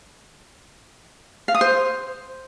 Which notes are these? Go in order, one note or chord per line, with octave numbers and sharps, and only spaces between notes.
F5
D#6
C5